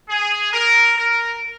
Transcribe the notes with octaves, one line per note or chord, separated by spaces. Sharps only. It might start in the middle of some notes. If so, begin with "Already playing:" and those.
G#4
A#4
A#4